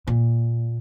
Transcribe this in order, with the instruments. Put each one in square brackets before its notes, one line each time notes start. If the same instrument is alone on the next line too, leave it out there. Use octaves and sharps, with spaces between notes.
[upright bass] A#2